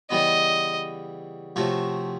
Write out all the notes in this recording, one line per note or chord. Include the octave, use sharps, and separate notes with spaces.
C#3 E3 G3 B3 D#5
C3 F3 A3 C#4 F#4